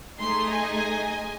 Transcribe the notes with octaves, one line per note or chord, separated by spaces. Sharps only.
A3 D#4 G#4 C6
D#5 G#5